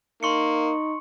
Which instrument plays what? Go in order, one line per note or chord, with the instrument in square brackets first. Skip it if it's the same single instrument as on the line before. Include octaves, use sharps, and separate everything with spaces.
[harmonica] A#3 [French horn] D#4 [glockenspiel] C6 C#6 C#7